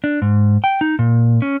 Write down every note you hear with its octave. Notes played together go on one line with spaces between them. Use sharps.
D4
G#2
G5
D#4
A#2
C#4